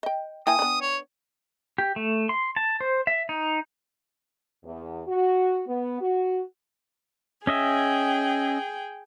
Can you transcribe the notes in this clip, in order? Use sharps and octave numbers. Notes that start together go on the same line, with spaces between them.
D#5 G5
A#3 E4 F5 G5 G#5 D#6
B3 D4
C#5
G4
A3
C6
A5
C5
E5
D#4
E2
F#4
B3
F#4
C#4 G#4 D#5 E5 G5